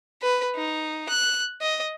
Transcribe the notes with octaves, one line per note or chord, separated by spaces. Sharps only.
B4
D#4
F#6
D#5